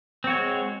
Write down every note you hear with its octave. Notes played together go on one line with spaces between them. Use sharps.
G#3 C4 F#4 C#5